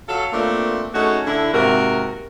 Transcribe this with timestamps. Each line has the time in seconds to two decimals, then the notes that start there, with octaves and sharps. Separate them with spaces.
0.09 F#3 A4 F5
0.33 A3 A#3 C4 D4 F4 A#4
0.95 A3 C#4 D#4 F#4 G#4 A4
1.26 D3 E4
1.54 G#2 C3 A#3 F#4 A#4